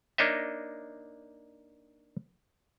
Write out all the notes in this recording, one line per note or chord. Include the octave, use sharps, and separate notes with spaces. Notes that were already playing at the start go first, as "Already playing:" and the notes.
A#3 D4 D#4 C#5 D#5 E5